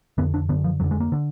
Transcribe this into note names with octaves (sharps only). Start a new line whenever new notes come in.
F2 D3 B3
D4
F#2 D3 B3
F3
F2 D3 F#3
G#3
A#3
D3